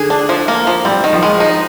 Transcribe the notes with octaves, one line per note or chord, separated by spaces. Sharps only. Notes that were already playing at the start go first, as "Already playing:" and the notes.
Already playing: D3 G#4
D4
F3
A#3
F3
G3 C4
D#3
F3
G#3
D#4